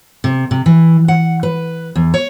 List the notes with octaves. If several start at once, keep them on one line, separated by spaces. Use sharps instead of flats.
C3
C3
E3
F#5
B4
E2
C#5